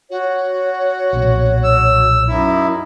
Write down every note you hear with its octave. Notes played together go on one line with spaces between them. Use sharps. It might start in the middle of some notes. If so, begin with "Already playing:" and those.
F#4 C#5
B1 A#2
E6
F#2 D#4 E4